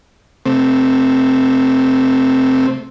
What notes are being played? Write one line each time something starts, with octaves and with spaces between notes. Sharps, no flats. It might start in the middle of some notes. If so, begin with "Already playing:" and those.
C3 A3 C4